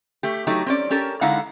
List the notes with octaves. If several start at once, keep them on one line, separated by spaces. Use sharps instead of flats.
A3 G4
F#3 A3 D#4 G4
C4 C#4 D5
C#4 G4 A4 A#4
D3 G#3 D#4 E4 F5 F#5